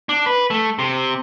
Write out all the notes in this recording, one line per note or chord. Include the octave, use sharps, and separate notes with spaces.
D4
B4
A3
C3